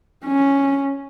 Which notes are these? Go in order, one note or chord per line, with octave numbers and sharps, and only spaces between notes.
C#4